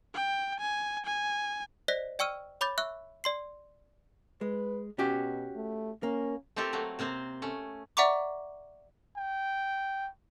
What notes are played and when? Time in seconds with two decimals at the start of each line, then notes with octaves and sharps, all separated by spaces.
0.14 G5
0.60 G#5
1.06 G#5
1.88 C5 D5 D#5 F#6 A#6 B6
2.19 D5 G5 C#6 E6 F6 D#7
2.61 C#5 B5 D6 G6 A6
2.78 E5 C#6 E6 F#6
3.24 D5 C6 C7
4.41 G#3 B4
4.98 B2 C#4 F#4 G4
5.55 A3
6.03 A#3 C#4
6.56 A3 C4 F4 G4 A4 A#4
6.73 F#3 A3 A#3
6.99 C3 A#3 C4 C5
7.42 A3 C#4
7.97 D5 E5 F#5 A#5 C#6 D6
9.17 G5